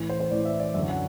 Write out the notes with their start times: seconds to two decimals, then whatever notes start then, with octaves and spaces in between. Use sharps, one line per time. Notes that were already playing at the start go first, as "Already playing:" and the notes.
Already playing: A2 E3
0.09 C5
0.20 C5
0.31 A2 E3 D5
0.45 E5
0.60 D5
0.74 F#2 D3 E5
0.89 F#5